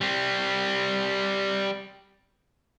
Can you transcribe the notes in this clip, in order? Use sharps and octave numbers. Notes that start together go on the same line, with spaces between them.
G3 C4